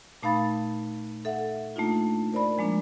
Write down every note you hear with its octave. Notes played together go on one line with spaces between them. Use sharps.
A#2 A3 D#4 F5 B5 A6
A4 E5 F#5
A3 A#3 D4 D#4 F4
A#4 C5 D5 B5
F3 G#3 A#3 D4